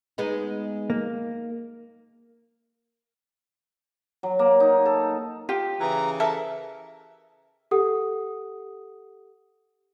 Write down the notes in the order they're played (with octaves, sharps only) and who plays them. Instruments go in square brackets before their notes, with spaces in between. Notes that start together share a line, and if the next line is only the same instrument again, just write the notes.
[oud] G#3 B3 D#4
[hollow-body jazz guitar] A#3
[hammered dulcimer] F#3
A#3
D#4
A4
[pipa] F4 [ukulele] G4
[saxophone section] C#3 E3 [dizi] A#5
[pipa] A4 A#4 E5 [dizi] A5
[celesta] G4 A4 F#5 D#6